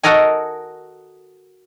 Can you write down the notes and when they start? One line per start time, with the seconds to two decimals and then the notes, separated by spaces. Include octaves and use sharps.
0.03 F#4 A4 A#4 D#5 G#5